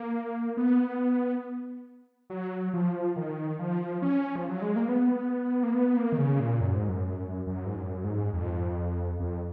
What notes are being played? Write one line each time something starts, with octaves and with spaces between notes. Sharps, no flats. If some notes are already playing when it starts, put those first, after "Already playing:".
Already playing: A#3
B3
F#3
F3
D#3
F3
C#4
F3
F#3
G#3
A#3
B3
A#3
B3
A#3
D#3
C#3
A#2
F#2
G#2
F#2
F#2
G#2
F#2
G#2
F2
F2